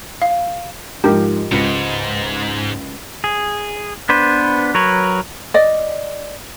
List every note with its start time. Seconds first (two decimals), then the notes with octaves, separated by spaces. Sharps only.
0.22 F5
1.04 G#2 F3 G4 A#4
1.52 C#2 G#2 C#7
3.24 G#4
4.09 B3 D4 B4 C5
4.74 F#3 A#4 B4 C#5
5.54 D5 D#5